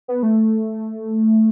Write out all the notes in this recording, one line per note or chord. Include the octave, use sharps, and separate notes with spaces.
B3
A3